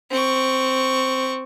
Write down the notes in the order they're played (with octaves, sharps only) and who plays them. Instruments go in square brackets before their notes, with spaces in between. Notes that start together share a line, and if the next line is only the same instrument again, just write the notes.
[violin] C4 C#6